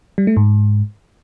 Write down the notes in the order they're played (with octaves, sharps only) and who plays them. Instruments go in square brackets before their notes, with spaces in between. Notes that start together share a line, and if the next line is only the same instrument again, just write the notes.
[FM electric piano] G3
A3
G#2